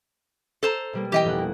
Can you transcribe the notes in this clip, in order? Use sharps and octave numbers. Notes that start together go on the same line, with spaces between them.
A4 C5 A#5
B2 G3 A#3
E3 G4 D#5 G5
F1 B2 F#5
A#3